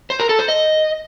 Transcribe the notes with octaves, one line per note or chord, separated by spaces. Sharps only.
C5
A#4
A4
C5
D#5